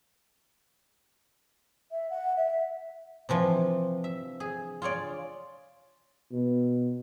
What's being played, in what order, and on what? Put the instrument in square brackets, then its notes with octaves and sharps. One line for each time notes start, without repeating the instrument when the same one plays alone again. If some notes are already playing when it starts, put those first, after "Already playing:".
[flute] E5
F#5
E5
[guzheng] C3 E3 F3
E5
G#4
F4 G#4 C#5 D5
[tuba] B2